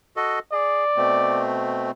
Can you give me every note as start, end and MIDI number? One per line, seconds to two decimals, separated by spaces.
0.17 0.39 66
0.17 0.39 69
0.17 0.39 75
0.53 0.84 68
0.53 1.45 74
0.97 1.91 47
0.97 1.91 57
0.97 1.91 60